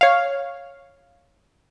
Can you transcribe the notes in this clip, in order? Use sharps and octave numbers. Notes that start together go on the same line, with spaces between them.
C#5 F5